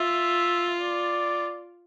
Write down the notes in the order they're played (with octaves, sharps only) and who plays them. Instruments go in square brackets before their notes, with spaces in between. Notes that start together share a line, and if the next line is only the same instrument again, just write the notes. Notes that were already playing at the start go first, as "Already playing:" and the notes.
Already playing: [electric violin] F4 [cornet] E5
[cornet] D5